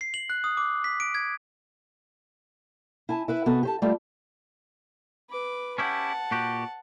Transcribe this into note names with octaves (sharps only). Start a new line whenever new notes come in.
C7
F#7
F#6
D#6
D6
B6
D7
G#6
E4 G#5 A5
E4 B4 E5
C3 B3 F#4 A4
G4 C5 A5
G3 A3 F4 G4 A4
B4 D6
C#4 E4 G4 F#5 A5
A#2 F#4 G4